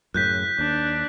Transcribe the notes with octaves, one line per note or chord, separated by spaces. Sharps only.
F#2 A2 C#3 F#6 G6 B6
D#2 D4